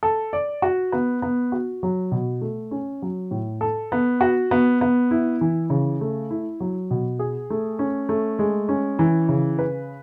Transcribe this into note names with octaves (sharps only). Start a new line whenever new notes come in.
A4
D5
F#4
B3
B3
F#4
F#3
B2
A3
C#4
F#3
A2
A4
B3
F#4
B3
B3
E4
E3
C#3
A3
E4
F#3
B2
G#4
A3
C#4
A3
G#3
C#4
E3
C#3
B4